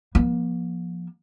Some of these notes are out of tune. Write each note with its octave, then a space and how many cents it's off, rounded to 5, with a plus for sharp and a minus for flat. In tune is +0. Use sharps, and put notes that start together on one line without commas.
F3 +0 A#3 +40